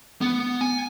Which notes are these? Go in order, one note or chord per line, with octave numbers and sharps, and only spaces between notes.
B3
G#5